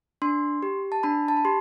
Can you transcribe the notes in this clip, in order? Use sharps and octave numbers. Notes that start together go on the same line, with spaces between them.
D4 C6
G4
A5
D4 B5
A5
B5
G4 C6